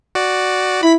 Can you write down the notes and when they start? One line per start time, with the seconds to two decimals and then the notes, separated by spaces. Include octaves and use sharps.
0.15 F#4 D5
0.83 E4 B5 B6